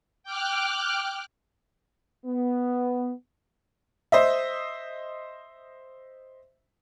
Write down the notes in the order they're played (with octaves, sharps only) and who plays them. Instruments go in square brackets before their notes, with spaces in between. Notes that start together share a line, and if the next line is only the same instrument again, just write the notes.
[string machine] G5 D6 F6 F#6
[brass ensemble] B3
[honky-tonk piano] C5 D#5 E5